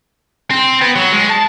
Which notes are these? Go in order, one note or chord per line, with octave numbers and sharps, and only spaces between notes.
C4
B3
F#3
G#3
A5